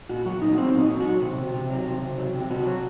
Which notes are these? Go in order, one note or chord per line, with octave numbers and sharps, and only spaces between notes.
A#2 F#4
F#3 F#4
A#2 D#4
F#3 C4
A#2
D#4
F#3
F#3 F#4
C3
C3
C3
F#3
C3
C3
F#3
C3
C3 F#4
F#3